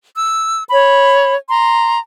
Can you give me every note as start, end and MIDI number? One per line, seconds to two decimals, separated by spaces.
0.16 0.64 88
0.71 1.34 73
0.71 1.34 83
1.48 1.98 82
1.48 1.98 84